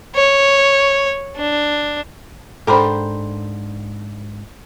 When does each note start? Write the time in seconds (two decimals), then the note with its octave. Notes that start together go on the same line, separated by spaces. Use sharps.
0.15 C#5
1.36 D4
2.67 G#2 D4 G4 A4 A#4 C5 B5